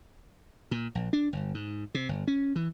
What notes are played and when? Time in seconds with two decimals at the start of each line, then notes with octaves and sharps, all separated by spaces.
0.71 A#2
0.95 A#1
1.13 D4
1.33 G1
1.54 G#2
1.95 C3
2.09 G1
2.28 C#4
2.56 E3